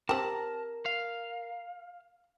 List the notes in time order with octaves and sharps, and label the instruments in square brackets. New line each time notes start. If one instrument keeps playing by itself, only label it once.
[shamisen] C4 G4 [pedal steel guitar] A#4 A#5 [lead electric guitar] A5
[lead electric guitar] F5